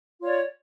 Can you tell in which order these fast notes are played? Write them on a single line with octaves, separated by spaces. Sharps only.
F4 C#5 D5